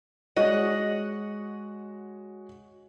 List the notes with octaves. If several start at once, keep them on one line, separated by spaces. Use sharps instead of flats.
G#3 F#4 C#5 D#5 F#5